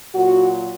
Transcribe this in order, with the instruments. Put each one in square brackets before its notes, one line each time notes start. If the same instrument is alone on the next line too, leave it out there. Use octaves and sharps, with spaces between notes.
[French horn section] A#2 F#3 F#4